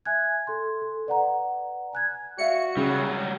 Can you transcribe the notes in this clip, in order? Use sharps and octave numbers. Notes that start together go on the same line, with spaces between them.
E5 G#5 F#6 G#6
A4 C6
A4
B4 D5 F#5 A#5
G#5 F#6 G#6
F#4 D5 E5 F5 C#7
C#3 F#3 G3 G#4